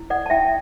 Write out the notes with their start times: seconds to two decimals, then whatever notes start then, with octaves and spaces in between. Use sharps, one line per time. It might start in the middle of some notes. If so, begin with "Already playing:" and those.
Already playing: E4
0.10 A4 D5 F#5
0.26 A5
0.30 E4 E5 G5